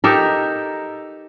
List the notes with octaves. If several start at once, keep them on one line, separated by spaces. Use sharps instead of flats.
D#4 G4 A4 A#4